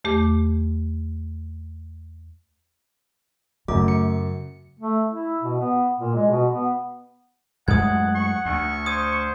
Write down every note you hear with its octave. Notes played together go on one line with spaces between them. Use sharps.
E2 A3 G4 D6
F#2 C#3 A3 D6
C#7
A3
E4
B2
B3
A#2
G#3
B2
B3
F#2 G#3 A3 F#5 D#6 G#6
F#5 C#6
D2 C#6
C5 D#6 G#6 D#7